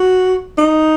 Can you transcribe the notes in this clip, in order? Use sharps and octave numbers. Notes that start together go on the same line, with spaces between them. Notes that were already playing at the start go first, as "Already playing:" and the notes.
Already playing: F#4
D#4